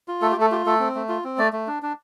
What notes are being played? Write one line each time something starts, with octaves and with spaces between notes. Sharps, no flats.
F4
A3 A4
G4
A3 A4
F4 G4
A3 A4
C4
A3
F4
C4
A3 D5
A3
D4
D4